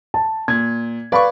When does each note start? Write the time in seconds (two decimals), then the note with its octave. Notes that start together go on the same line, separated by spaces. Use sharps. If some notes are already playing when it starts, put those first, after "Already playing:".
0.14 A5
0.48 A#2 G#6
1.12 B4 D5 F5 B5 C#6